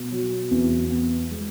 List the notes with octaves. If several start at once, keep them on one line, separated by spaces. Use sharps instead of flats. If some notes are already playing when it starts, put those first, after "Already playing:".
Already playing: B2
F#3
E2
B3
G#3